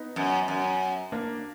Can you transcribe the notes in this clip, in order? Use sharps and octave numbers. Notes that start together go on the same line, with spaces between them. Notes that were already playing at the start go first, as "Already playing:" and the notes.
Already playing: B3 D#4
F#2
F#2
A#3 D4